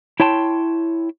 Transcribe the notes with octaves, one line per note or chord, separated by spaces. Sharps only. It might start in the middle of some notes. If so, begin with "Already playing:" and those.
E4 C#5 G5 A5 C6